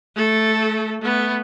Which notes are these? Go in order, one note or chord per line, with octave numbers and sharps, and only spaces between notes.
A3 A4
A3 B3